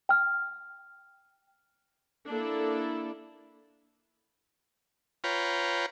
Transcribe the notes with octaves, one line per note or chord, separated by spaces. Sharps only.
G5 F6
A#3 D4 E4 A4
F4 B4 C#5 G5 A#5